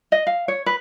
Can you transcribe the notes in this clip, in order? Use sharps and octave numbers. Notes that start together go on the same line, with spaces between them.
D#5
F5
C#5
B4